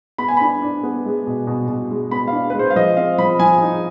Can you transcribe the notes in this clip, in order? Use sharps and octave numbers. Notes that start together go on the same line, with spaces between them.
B3 B5
G#5
D4 B5
D4
B3
G#3
B2
B2
B2
G#3
B3 B5
D4 F5
G#3 B4
C5
F5
F3 D#5
C4 F5
F3 B5
F3 G#5
D#4